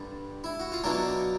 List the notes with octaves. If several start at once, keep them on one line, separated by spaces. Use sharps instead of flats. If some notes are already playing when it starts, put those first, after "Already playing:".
Already playing: G2 D3 G3
E4
F#4
F4
B2 F#3 A#3 D4 E4